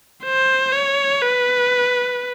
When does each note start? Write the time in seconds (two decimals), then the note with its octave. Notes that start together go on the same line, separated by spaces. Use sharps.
0.24 C5
0.73 C#5
1.22 B4